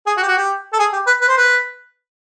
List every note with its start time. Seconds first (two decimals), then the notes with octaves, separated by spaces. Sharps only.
0.07 G#4
0.17 F#4
0.23 G4
0.28 F#4
0.37 G4
0.73 A4
0.79 G#4
0.93 G4
1.07 B4
1.21 B4
1.28 C5
1.37 B4